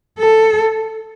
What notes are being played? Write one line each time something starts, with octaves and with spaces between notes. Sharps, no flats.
A4